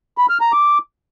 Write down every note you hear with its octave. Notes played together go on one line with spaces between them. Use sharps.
B5
F6
A#5
D6